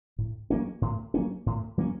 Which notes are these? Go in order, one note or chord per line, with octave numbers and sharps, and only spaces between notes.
A2
F#3 A#3 C#4
A2
F#3 A#3 C#4
A2
F#3 A#3 C#4